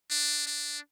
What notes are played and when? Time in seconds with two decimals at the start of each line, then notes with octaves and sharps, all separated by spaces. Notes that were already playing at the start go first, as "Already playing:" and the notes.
0.10 D4
0.47 D4